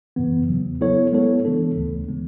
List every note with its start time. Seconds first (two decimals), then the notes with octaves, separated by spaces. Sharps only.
0.16 F#2 C#3 E3 B3
0.48 E2 C#3 F#3
0.80 F#3 B3 E4 A4 C#5
1.12 G#3 B3 E4 A4 C#5
1.45 C#3 E3 B3 D4 A4
1.77 D2 D3 A3
2.08 C#3 E3 G#3 B3